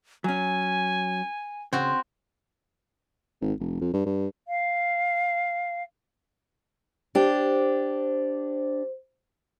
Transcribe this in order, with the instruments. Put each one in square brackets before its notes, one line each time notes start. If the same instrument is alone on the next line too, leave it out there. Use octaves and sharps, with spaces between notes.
[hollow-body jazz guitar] F#3 C#4 [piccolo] G#5
[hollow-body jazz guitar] C#3 [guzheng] C4 F#4
[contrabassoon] G#1
F1
F2
G2
G2
[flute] F5
[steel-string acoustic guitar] D4 G4 [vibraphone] C5